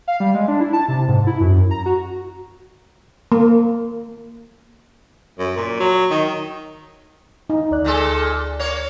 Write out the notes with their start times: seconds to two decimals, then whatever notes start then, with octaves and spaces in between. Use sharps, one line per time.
0.08 F5
0.20 G3
0.35 G#3
0.48 D4
0.60 E4
0.73 A5
0.88 C3
1.08 G#2
1.27 E4
1.41 F#2
1.71 A#5
1.86 F#4
3.32 A#3
5.39 F#2
5.57 A#2
5.80 F#3
6.11 D#3
7.50 D#4
7.71 D2 D5 F#6
7.85 A#2 G#3 A4
8.59 A#3 C#5